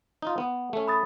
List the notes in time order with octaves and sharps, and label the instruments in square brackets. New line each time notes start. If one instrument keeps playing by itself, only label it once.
[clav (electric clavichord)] D#4 F4
B3
A3 C#4
[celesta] B5 D#6 A6